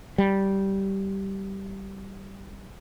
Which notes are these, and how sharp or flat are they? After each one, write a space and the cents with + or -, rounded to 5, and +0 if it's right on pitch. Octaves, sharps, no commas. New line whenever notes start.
G3 -10